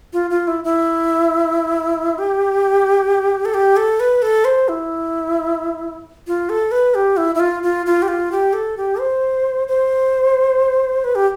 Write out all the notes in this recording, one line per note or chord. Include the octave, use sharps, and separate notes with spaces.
F4
F4
E4
E4
G4
A4
G4
A4
B4
A4
C5
E4
F4
A4
B4
G4
E4
E4
F4
F4
F4
G4
F4
G4
A4
G4
C5
C5
B4
G4